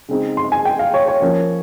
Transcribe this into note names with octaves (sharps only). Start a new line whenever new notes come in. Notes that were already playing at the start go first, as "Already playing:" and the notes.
C#3 G#3 C4 D#4
C6
G#5
G5
F5
C#5
C#5
F3 A#3 C#4